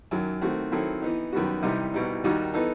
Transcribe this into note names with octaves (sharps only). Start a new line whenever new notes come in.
F#2 D#3 F#3
D#3 A3 C4 F#4
D#3 F#3 C4 E4 A4
E3 B3 D#4
F#2 D#3 G3 B3 F#4
C2 C3 E3 G3 D#4
C2 B2 G3 D#4
D#2 D#3 G3 D#4 F#4
E3 B3 D#4 A4